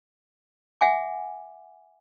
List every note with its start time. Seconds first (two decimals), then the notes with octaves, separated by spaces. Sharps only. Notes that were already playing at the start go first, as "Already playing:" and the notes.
0.81 E5 F#5 G#5 D6